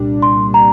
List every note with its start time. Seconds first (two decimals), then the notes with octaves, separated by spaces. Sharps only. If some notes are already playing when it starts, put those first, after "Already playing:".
Already playing: C2 A#2 G3 D4
0.22 C6
0.54 A#5